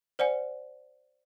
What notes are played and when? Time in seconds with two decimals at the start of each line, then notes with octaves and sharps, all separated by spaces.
0.19 C5 D5 F#5 G#5